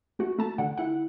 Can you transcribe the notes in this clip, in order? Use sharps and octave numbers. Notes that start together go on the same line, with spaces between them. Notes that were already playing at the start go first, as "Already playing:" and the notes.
A3 F#4
A3 A5
D3 F#5
E4 F#5